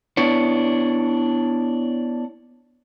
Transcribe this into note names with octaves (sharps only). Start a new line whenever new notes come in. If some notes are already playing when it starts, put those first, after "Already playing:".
B3 D4 E4 C#5